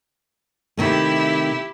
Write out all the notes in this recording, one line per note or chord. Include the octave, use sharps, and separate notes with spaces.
C3 D#3 A3 E4 G4